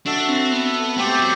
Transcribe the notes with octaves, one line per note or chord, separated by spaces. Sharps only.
D4 F#4 A4 E5
C4
B3
A3 C4 G4 C5
F#3